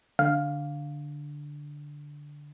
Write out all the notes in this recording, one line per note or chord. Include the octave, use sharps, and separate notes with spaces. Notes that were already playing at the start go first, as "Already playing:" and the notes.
D3 F5